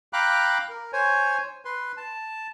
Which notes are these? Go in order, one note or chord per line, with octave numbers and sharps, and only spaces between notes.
F5 G5 A#5 B5 D6 F#6
A#4
C5 C#5 G#5
B4 C6
A5